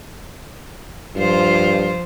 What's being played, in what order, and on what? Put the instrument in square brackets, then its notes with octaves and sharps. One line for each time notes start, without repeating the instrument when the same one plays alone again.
[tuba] G2 [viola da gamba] F3 F4 C5